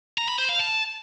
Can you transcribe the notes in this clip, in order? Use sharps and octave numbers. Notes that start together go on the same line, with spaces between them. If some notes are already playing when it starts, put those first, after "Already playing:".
A#5
B5
C5
F5
A5